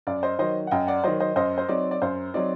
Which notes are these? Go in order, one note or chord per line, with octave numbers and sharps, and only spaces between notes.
F#2 D5
C5 D#5
D#3 F#3 C5 D#5
F#5
F#2 D#5 G5
D5 F#5
D#3 F#3 C5 D#5
C5 D#5
F#2 C5 D#5
C5
F#3 C4 D#4 D5
D5
F#2 C5
F#3 C4 D#4 D5